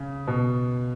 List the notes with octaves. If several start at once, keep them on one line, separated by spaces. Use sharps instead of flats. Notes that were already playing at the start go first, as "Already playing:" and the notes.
Already playing: C#3
B2